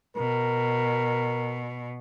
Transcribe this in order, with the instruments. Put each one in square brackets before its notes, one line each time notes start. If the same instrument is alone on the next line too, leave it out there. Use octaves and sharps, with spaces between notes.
[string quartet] B2 [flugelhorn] A#4